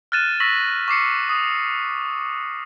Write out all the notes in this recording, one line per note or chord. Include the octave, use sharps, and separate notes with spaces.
F6 F#6 A6 D#7 E7
C#6 E6 A#6 B6 F#7
C#6 D6 C7 C#7
D#6